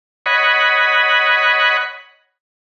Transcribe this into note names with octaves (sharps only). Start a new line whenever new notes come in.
C#5 D#5 F#5 B5